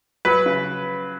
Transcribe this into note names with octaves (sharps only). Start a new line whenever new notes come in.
F#3 B4
C#3